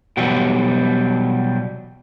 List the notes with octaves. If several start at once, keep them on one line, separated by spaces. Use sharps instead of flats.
B2 E3 F#3 G3